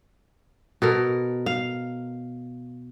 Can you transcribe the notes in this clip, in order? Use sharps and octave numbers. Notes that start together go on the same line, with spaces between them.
B2 A4 A#4
F5